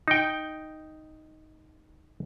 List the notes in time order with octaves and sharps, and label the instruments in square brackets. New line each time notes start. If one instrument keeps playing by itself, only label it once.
[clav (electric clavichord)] D#4 G5